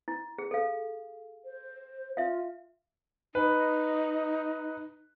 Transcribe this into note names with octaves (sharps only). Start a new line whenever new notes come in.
E4
G#4
A4 F5
C5
F4 E5 F5
D#4 B4